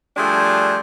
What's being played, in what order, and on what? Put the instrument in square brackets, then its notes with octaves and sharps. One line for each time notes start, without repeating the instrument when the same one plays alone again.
[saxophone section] F3 G3 A3 D4 G#4